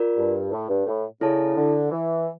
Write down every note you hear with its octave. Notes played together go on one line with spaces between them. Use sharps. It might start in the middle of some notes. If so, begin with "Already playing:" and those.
Already playing: F4 A#4 D5
G2
A2
G2
A2
C#3 E4 A4 D5 A5
D3
E3